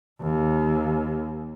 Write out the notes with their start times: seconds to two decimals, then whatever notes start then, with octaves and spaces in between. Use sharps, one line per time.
0.20 D#2